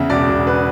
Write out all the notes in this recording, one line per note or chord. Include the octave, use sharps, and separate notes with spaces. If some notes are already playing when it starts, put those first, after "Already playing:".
Already playing: E2 C#3 E5
E1 D5
E1
B4